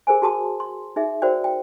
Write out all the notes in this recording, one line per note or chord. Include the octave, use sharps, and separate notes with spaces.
G#4 A#4 C5 G#5
F#4 G#4 A5 C6 D#6
C6
D#4 G#4 E5
F#4 A#4 C5 D5 G5
G5